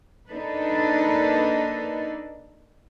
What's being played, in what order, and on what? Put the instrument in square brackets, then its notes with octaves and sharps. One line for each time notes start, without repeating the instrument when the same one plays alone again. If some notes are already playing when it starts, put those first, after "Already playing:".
[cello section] A#3 D4 D#4 A4 B4